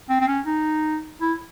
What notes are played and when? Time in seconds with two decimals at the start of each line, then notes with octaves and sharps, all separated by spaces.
0.09 C4
0.21 C4
0.27 C#4
0.46 D#4
1.20 E4